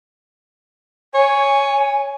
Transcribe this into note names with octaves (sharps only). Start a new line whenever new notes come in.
C#5 G#5